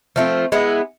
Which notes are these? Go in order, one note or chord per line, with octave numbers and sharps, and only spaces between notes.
F3 A3 C4 F4
G#3 B3 E4